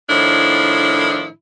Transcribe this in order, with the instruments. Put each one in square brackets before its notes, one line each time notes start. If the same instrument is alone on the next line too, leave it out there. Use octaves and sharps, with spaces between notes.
[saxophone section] A2 D#3 F3 D4 E4